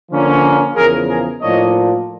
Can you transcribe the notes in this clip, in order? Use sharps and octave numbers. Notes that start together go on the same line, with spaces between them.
D3 F3 A#3 C#4
E2 C#3 F3 G#4 A#4
G#4 A#4
A2 F3 A#3 D4 C#5 D#5